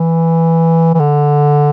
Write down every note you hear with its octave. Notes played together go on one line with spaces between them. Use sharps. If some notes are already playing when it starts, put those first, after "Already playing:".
Already playing: E3
E3
D3